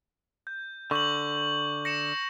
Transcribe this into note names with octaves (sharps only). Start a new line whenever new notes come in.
G6
D3 C#6 G6 F#7
A#6 C#7 E7